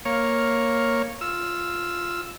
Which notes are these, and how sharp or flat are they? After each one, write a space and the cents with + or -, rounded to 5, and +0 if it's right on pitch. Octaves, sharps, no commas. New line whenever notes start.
A#3 +0 C#5 -10 F5 +0
F4 +0 E6 +0